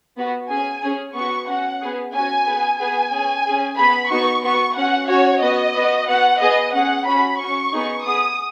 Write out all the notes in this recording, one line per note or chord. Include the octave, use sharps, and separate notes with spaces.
B3 F#4
C#4 G#4 G#5
C#4 G#4
B3 F#4 C#6
C#4 F#4 F#5
B3 G#4
C#4 F#4 G#5
B3 G#4
B3 G#4 G#5
C#4 G#4
C#4 G#4
B3 G#4 B5
B3 D#4 F#4 C#6
B3 F#4 C#6
C#4 F#4 F#5
C#4 F#4 C#5
B3 F#4 D#5
B3 F#4
B3 F#4 F#5
B3 G#4 D#5
C#4 G#4 F#5
C#4 F#4 B5
C#4 F#4 C#6
B3 D#4 G#4
B3 G#4 D#6